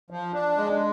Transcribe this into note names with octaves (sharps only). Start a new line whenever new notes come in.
F3
D4
G#3